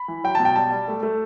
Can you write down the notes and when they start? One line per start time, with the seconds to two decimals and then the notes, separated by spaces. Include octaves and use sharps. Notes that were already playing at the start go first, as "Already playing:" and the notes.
Already playing: B5
0.08 E3
0.24 F#3 G5
0.35 B2 A5
0.45 G5
0.56 G3 A5
0.72 G3
0.88 A3
1.03 A3